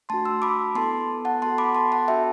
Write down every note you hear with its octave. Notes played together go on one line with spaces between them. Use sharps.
A3 D4 F#4 A5 C6
C6 E6
B5 D6
B3 E4 A4 A5 C6
F#5 A5
B3 F#4 A4 A5 C6
B5 D6
A5 C6
F#5 A5
D4 F#4 A4 E5 G5